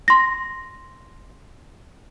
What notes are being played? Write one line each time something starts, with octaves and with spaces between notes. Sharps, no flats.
C6 A#6